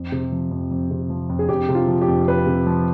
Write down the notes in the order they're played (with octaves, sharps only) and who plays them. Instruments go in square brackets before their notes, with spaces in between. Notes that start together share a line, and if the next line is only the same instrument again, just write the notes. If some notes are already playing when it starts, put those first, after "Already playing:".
Already playing: [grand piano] F2
C3
F3
F2
F2
C3
F3
F2
[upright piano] G#4
[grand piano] F2 [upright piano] G4
[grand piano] C3
[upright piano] F4
[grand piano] F3
[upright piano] G4
[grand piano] F2
[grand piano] F2 [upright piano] B4
[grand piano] C3
F3